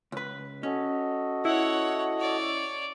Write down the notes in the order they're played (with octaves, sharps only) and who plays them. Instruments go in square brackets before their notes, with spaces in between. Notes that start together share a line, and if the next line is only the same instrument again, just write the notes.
[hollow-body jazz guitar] C#2 B4
[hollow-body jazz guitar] C#4 [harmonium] F#4 A4 D#5
[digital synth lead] E4 [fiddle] C#5 F#5
[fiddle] C#5 D5